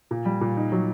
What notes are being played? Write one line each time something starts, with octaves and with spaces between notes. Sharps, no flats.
A#2
G3
A#2
D#4
F#3